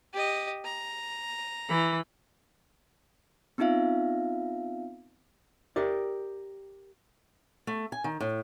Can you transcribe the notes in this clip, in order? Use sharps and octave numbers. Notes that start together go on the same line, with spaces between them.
G4 D#5
A#5
E3 B5
B3 C4 D#4 F4 E5 F5
G4 A#4 D5
A3
G#5
D#3
A2